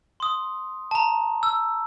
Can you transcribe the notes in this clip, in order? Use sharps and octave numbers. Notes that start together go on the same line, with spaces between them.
C6 D#6
A5 A#5
E6